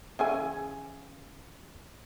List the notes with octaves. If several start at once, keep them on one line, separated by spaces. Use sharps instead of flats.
C#3 E3 G#5